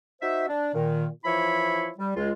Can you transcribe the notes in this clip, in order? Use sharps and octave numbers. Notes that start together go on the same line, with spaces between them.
D#4 F#4 C5 E5
D4
A#2 D#3
E3 F3 E4 C#5 E5 B5
G3
C#2 G#3 F4